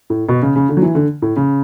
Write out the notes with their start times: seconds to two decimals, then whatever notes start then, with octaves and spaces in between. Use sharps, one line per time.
0.10 A2
0.29 B2
0.42 C#3
0.55 C#3
0.69 D3
0.77 F#3
0.82 E3
0.95 D3
1.22 A2
1.36 C#3